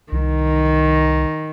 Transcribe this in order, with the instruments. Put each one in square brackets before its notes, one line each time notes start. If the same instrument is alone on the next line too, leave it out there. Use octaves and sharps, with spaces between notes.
[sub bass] C2 [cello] D#3